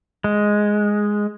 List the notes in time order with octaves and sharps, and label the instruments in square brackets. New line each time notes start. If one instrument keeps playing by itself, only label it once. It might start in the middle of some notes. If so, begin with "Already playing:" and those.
[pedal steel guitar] G#3